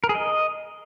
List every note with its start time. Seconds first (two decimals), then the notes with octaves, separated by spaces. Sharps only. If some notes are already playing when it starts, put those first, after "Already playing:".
0.04 A#4
0.09 G#4
0.15 D#5